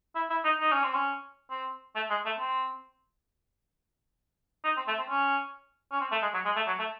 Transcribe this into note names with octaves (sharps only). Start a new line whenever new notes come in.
E4
E4
D#4
D#4
C#4
C4
C#4
C4
A3
G#3
A3
C4
D#4
C4
A3
C4
C#4
C#4
C4
A3
G#3
F#3
G#3
A3
F#3
A3